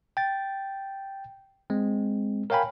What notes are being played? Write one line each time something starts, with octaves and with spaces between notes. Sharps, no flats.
G5 A6
G#3 C4
A#4 C#5 F5 G5 G#5 B5